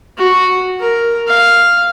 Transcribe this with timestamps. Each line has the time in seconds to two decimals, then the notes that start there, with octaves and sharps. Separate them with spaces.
0.17 F#4
0.80 A#4
1.28 F5